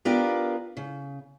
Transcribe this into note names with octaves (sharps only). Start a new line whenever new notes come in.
B3 D4 F4 G4 A#4 B4
C#3